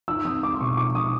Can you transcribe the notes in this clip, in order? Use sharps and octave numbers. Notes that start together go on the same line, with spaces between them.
D#4 E6
C4 D#6
G#3 D6
C6
B2 C#6
D#4 D6
D#4 D#6